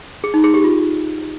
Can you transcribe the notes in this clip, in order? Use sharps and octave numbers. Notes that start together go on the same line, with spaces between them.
G#4
D#4
G#4
G4
F4